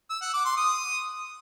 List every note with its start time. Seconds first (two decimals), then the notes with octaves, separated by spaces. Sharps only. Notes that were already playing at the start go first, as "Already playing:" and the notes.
0.10 E6
0.22 F#5
0.34 D6
0.45 C6
0.57 D#6